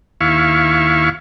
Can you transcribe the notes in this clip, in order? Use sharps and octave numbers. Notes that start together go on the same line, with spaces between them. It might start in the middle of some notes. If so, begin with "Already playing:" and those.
D#2 E4 F5 C#6